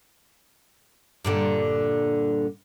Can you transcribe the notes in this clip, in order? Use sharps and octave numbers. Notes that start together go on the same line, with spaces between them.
G2 A#2 D3